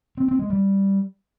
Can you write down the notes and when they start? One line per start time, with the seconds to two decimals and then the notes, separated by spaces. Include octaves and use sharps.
0.17 C4
0.28 C4
0.39 G#3
0.50 G3